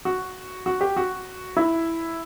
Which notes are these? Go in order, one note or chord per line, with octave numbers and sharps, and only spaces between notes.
F#4
F#4
G4
F#4
E4